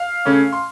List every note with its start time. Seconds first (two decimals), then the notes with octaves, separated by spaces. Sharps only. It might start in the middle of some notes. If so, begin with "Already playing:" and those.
Already playing: F5 F6
0.25 C#3 A3 C#4
0.53 C6